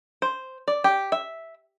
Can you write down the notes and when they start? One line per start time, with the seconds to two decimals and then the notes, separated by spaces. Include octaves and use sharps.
0.22 C5
0.68 D5
0.84 G4
1.12 E5